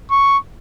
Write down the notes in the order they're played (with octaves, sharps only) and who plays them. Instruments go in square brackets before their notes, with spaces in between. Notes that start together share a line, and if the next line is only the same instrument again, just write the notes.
[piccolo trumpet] C#6